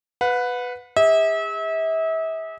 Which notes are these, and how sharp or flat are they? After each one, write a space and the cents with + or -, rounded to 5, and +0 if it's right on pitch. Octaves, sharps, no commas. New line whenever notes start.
B4 +5 F#5 -35
G#4 -40 E5 -35